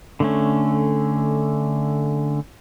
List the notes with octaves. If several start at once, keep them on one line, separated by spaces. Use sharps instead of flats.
D3 A3 C#4